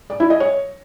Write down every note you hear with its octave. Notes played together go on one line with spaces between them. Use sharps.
D5
E4
D#5
C#5